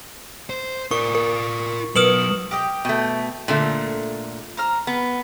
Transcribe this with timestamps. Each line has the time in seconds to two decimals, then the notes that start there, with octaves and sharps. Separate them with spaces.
0.50 C5
0.91 F4 A#4 D5 C#6
1.15 A#4
1.96 B2 F#3 A#4 B4 D#6 F6 E7 F#7
2.51 G4 D#5 G5
2.85 B2 A3 G5
3.48 A#2 D3 A3
4.57 C5 A#5 F6
4.87 B3 B4